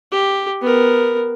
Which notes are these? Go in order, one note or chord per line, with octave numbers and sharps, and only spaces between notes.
G4
B3 A#4